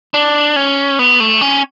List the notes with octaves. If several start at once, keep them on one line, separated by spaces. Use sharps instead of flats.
D4
C#4
B3
A3
C#4